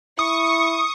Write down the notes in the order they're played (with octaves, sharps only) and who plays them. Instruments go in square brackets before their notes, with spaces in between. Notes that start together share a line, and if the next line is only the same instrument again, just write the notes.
[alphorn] E4 [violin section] C#6 [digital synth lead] D#6